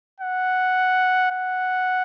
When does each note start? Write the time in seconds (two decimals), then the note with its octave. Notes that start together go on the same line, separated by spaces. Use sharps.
0.20 F#5
1.31 F#5